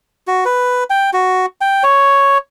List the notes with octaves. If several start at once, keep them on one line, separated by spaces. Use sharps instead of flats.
F#4
B4
G5
F#4
G5
C#5